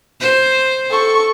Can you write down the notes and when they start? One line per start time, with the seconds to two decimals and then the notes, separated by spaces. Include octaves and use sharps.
0.20 C5
0.90 A4 C#6